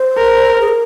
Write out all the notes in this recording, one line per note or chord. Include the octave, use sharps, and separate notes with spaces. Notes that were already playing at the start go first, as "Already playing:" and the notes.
Already playing: C5
A#4
G#4
A#4